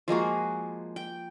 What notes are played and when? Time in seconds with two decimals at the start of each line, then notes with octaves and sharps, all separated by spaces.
0.08 F3 G#3 A#3 F#4
0.96 G5